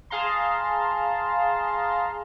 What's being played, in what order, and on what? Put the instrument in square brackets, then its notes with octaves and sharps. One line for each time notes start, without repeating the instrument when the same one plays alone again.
[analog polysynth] G#4 F5 A5 A#5 C6